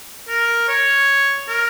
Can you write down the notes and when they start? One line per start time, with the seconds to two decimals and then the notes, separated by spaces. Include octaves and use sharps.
0.28 A#4
0.68 C#5
1.48 A#4